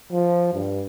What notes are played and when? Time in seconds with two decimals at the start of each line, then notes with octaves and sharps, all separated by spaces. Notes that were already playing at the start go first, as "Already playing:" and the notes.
0.11 F3
0.53 G2